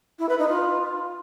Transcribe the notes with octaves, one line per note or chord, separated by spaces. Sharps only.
E4
B4
D#4
F4